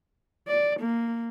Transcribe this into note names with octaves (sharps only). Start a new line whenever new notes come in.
D5
A#3